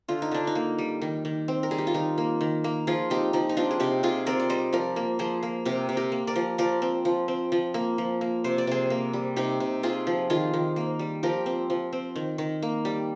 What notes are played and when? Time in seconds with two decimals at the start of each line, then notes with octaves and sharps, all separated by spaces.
0.08 D3 F4
0.22 D#4
0.32 D3 D4
0.47 D#4
0.55 A#3
0.78 G3
1.02 D#3
1.25 D#3
1.48 C4
1.63 A#4
1.71 G3 G#4
1.78 G4
1.87 F4
1.94 D#3 D#4
2.18 A#3
2.41 D#3
2.64 A#3
2.87 F3 F4 G#4
3.10 C4 D#4 G4
3.33 F3 D#4
3.49 D#4
3.57 C4 D4 F4
3.71 G#4
3.80 C3 D#4 G4
4.03 C3 F4 G#4
4.27 C4 A#4 D5
4.40 D5
4.49 G3 C5 D#5
4.73 F3 A#4 D5
4.96 A#3
5.19 F3 G#4 C5
5.43 A#3
5.66 C3 G4 A#4
5.89 C3
5.97 G4 A#4
6.12 A#3
6.27 A#4 D5
6.36 F3
6.58 F3 A#4 D5
6.82 C4
7.05 F3
7.28 C4
7.52 F3
7.74 A#3
7.98 F3
8.21 A#3
8.44 C3 C5
8.58 D5
8.67 C3 G#4 C5
8.90 A#3
9.13 G3
9.36 C3 D#4 G4
9.60 C3
9.83 C4 F4 G#4
10.07 F3
10.30 D#3 F4 G#4
10.53 D#3
10.76 A#3
10.99 G3
11.23 F3 G4 A#4
11.46 C4
11.70 F3
11.93 C4
12.16 D#3
12.38 D#3
12.62 A#3
12.85 G3